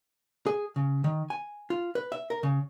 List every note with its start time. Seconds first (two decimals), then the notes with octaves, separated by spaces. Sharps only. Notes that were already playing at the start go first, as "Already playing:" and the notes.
0.47 G#4
0.76 C#3
1.04 D#3
1.30 G#5
1.70 F4
1.95 B4
2.12 E5
2.30 A#4
2.43 C#3